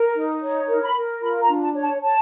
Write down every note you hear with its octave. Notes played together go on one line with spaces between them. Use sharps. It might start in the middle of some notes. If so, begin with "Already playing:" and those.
Already playing: A#4
D#4
C#5
A#4
B5
A#4
F4 B5
A#5
D4
A5
C#5
A5
C#5 A5